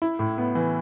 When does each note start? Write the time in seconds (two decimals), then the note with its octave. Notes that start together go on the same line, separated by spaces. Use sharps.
0.02 E4
0.19 A2
0.38 B3
0.55 E3